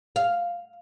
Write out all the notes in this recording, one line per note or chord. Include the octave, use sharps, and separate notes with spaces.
F5